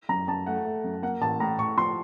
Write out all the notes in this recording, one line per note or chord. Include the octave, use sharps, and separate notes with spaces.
F#2 A#5
F#2 A5
A3 F#5
A3
F#2
A#3 F#5
A1 A5
A2 A#5
A2 C#6
F3 C6